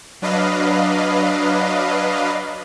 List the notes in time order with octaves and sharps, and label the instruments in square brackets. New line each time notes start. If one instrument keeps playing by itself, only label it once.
[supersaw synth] F#3 D4 B4 D#5 F5